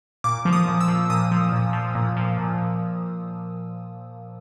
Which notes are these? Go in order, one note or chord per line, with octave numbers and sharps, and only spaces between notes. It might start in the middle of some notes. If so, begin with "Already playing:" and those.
A#2 D6
F3
D#6
A#2
E6
F3
A#2 D#6
F3
A#2
F3
A#2
F3
A#2